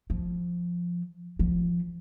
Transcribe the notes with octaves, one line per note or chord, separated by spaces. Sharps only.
F3
F3